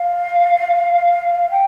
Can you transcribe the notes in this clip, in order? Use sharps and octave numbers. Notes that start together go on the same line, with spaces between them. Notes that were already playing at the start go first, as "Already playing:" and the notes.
Already playing: F5
G5